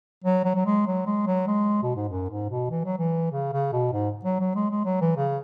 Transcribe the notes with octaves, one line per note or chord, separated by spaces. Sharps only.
F#3
F#3
F#3
G#3
F#3
G#3
F#3
G#3
B2
G#2
F#2
G#2
B2
E3
F#3
E3
C#3
C#3
B2
G#2
F#3
F#3
G#3
G#3
F#3
E3
C#3